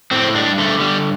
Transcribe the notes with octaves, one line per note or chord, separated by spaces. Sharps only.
A2 C4
G2 D4
D3 A3
G2 G3